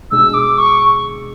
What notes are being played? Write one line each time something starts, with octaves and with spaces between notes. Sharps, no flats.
B2 G#3 D4 G#4 E6
D6
C#6